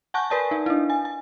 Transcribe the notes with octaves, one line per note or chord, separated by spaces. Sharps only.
F#5 G#5 A5 C#6 F#6 G6
A#4 B4 D5 G#5 A5
D#4
D4 E4
G#5
G#5